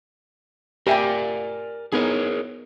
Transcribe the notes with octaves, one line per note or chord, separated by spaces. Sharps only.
G4 A#4 D5 E5 G5 G#5
B3 D#4 G#4 A#4 C#5 G#5